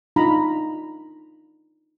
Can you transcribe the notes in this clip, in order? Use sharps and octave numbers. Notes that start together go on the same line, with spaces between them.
D4 D#4 F4 A#5 B5